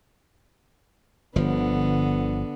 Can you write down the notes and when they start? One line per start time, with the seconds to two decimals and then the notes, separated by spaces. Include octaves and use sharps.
1.36 G1 D3 F3 B3